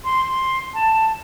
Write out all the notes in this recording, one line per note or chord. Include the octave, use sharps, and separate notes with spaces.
C6
A5